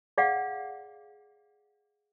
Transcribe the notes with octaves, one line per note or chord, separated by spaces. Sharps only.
G#4 D5 F5 F#5